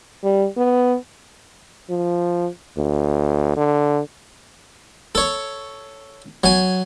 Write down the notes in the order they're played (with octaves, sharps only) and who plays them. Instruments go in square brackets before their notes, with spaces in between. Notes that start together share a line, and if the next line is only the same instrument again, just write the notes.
[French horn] G3
B3
[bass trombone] F3
D2
D3
[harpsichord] A4 C#5
F#3 G#5